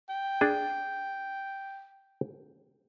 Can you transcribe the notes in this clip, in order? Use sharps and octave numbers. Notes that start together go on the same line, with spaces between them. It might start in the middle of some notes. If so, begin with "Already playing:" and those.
G5
D4 G#4